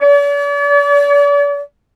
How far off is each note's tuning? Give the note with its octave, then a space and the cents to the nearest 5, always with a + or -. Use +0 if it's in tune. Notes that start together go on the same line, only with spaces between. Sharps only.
D5 -45